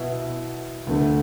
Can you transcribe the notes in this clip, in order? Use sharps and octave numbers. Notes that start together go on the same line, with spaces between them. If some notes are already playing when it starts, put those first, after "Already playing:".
Already playing: B2 B3 E4
D2 D3 A3